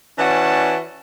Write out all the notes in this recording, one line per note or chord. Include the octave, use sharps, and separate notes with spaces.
E3 C#4 F#4 D5 A5